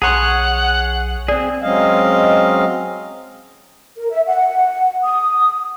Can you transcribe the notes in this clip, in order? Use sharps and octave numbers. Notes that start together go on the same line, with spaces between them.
B1 G#4 C#5 F#5 A5 A#5 C6
C4 G#4 D5
F#3 G#3 C4 C#4 D#5 F5
A#4
E5
F#5
D#6